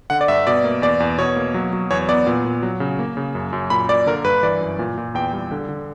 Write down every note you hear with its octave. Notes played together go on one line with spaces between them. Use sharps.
D3 F#5
D5
G2 E5
B2 D5
A#3
E2 D5
E2
B2 C#5
A#3
F#3
F#3
E2 C#5
B3 D5
A#2
A#2
F#3
C#3
A#3
C#3
F#2
F#2
A#2 B5
A#3 D5
D3 A#4
G2 B4
E3 D5
F#2
A#2
A#2
E2 G5
G3
D3
D3